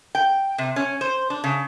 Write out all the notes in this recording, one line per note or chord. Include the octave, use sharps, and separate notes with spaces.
G5
C3
C#4
C5
D4
C#3